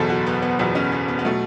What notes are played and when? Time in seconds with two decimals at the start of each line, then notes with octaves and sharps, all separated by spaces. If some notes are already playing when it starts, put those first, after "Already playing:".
Already playing: F#1 E2 B2 F#3 A4
0.10 F#4
0.26 B3
0.42 B3
0.59 F#1 E2 B2 F#3 B3
0.75 C#4
0.92 B3
1.08 B3
1.19 B3
1.25 B2 F#3 A3